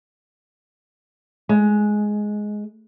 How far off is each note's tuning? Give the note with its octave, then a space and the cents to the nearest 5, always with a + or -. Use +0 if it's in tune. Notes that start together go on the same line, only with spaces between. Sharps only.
G#3 +10